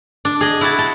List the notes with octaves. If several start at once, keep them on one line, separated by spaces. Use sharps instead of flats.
D4
G#4 D#5
E4 F#4 A5
A5